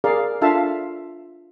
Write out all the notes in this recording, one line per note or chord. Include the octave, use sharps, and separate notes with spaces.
G#4 A#4 D5 F5
D4 F4 A4 E5 F5 A5